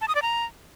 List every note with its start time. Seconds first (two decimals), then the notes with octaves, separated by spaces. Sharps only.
0.01 A5
0.08 D#6
0.15 D5
0.22 A#5